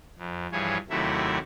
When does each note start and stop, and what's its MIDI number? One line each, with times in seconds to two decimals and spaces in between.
0.18 0.47 41
0.52 0.77 43
0.52 0.77 52
0.52 0.77 53
0.52 0.77 68
0.52 0.77 73
0.90 1.38 39
0.90 1.38 48
0.90 1.38 54
0.90 1.38 57
0.90 1.38 64
0.90 1.38 76